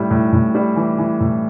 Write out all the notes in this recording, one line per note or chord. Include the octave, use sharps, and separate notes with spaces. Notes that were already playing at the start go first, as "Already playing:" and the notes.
Already playing: A2 G3
A2
A2
G3
E3
E3
A2